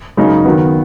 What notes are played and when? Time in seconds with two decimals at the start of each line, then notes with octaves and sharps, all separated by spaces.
0.17 F#2 C#3 G#3 D#4
0.45 D#3 F#3 B3